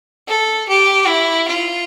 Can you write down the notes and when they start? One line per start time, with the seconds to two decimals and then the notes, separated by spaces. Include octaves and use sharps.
0.28 A4
0.69 G4
1.07 E4
1.48 F4